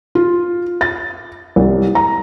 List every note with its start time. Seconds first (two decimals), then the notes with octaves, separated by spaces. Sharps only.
0.15 F4
0.81 A6
1.56 C2
1.95 A#5